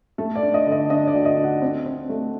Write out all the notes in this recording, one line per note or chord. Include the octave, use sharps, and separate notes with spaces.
A3 A4
D5
D4
D#5
D3
D#5
D4 D#5
D5
D2
D#5
D4
F#5
C4
C4
A3